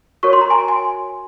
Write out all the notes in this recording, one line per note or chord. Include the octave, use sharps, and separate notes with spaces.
F#4 A#4 C#5 C#6
C6
A#5
G#5 C6
G#5 C6